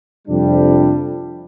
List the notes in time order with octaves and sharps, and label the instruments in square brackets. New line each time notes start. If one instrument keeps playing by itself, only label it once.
[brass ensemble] F2 C3 G3 D4